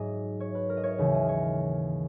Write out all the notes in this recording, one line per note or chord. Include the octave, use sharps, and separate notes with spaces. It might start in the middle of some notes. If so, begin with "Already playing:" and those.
Already playing: G#2 F#3 D#5
C#5
B4
A#4
D#5
C#5
D#2 C#3 E3
D#5
C#5